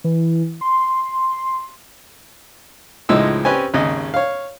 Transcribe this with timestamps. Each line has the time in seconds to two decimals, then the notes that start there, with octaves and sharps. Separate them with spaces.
0.04 E3
0.61 C6
3.09 C#2 A2 F3 G#3 D#4 E6
3.45 C4 C#4 G4 B4 C#5 G#5
3.74 G#1 D#2 C#3 D#5
4.14 C#5 F5